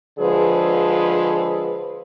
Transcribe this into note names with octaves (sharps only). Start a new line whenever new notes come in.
D3 F3 G#3 G#4 B4